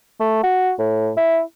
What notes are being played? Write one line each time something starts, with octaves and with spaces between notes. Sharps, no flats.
A3
F#4
A2
E4